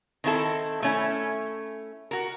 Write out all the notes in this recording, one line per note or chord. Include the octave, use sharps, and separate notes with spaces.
D#3 C4 E4 A4
A3 C#4 E4
F#4 A#4